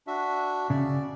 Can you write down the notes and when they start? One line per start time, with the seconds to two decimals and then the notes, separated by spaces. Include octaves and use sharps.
0.07 D4 F#4 E5
0.70 C#3 D5